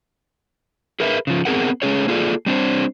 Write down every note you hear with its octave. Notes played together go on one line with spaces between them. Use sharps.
G#4 A#4 B4 E5
C#3 F3
B3 C4 G#4 A#4 F#5
G#3 A3 C#4 G#4 C#5
A#3 F4 G#4 A4 D5
G3 C4 D4 C5